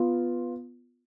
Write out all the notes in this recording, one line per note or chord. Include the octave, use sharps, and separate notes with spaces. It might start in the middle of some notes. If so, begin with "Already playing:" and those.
Already playing: B3 F4 B4